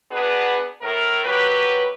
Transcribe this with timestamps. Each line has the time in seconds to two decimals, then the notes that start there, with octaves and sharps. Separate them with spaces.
0.12 B3 D4 F#4 G#4 B4
0.82 A2 A#4
1.24 F#2 F#3 G4 B4